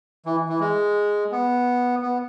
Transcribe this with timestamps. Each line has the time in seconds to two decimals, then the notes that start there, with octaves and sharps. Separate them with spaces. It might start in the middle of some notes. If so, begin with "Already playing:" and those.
0.26 E3
0.49 E3
0.61 G#3
1.32 B3
2.02 B3